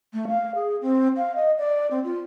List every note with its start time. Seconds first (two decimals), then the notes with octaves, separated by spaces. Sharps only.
0.14 A3
0.28 F5
0.55 G#4
0.82 C4
1.17 F5
1.36 D#5
1.58 D5
1.91 C4
2.04 F4